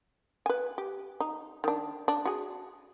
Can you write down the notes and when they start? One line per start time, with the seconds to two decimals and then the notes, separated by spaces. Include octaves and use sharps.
0.46 B4 G#5
0.78 G4
1.20 D#4
1.64 D#3 D4
2.08 D4
2.25 F#4 G#4